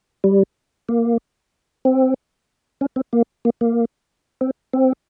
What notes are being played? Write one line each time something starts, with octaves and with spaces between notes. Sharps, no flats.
G3
A#3
C4
C#4
C4
A#3
A#3
A#3
C4
C4